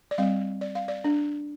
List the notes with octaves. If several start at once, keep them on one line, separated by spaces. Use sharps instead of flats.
D5
G3 C4 F5
D5
F5
D5
D4